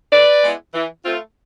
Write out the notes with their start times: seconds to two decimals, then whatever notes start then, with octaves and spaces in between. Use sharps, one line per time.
0.11 D3 B4 D5
0.42 G#3 B3 E4
0.73 E3
1.04 A3 C4 F4